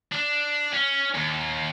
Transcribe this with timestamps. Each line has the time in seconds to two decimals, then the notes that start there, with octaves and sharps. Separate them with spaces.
0.12 D4
0.73 C#4
1.15 D#2